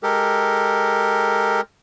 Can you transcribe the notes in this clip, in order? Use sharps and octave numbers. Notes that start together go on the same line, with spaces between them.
G#3 G4 A4 A#4